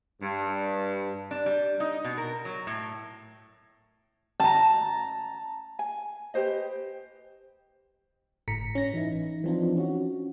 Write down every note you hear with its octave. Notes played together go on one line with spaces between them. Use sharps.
G2
D4
G3
D#4
B2
A#4
F#3
A2
A5 A#5
G#5
G4 B4 C5 D#5
G1 A2 A3 A#5 B6 C#7
C#4 A#6
E3 D#4 E4
E3 F3 C4 D4 D#4 F4
C#4 F#4